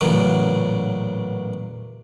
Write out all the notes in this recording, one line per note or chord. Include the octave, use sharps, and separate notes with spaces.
A1 E2 A#2 C#3 F#3